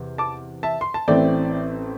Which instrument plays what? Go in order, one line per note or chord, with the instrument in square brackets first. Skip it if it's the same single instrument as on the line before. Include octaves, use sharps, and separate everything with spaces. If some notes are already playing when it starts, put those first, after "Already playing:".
Already playing: [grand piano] E2 C3
A5 D6
E5 A5
C6
A5
A1 A2 A3 C4 D5 G5